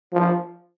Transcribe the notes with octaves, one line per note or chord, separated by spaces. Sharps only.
F3